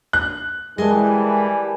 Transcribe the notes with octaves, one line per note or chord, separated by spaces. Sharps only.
F#6
E3 G3 G#3 A#4 G#5 A5